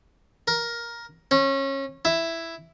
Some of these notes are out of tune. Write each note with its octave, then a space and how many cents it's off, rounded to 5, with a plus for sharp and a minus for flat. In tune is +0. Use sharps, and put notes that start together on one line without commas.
A#4 +10
C#4 -25
E4 +5